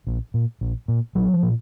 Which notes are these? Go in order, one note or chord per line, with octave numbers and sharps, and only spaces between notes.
A#1
A#2
A#1
A#2
A#1 F#3
F3
A#2